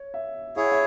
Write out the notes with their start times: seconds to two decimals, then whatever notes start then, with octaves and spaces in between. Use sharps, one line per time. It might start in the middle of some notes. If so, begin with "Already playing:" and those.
Already playing: C#5
0.14 E5
0.56 E4 G#4 C#5 E5
0.63 F#5
0.72 E5